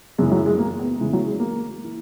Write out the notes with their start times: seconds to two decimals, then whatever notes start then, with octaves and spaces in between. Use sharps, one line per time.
0.18 F#2 C#3 E3 G#3
0.32 F#3
0.46 G#3
0.59 A#3
0.79 B3
0.99 E2 C#3 E3 G#3
1.13 F#3
1.26 G#3
1.40 A#3
1.84 E3